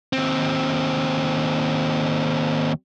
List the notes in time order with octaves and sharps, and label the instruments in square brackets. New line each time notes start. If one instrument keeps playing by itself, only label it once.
[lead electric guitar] D#2 C4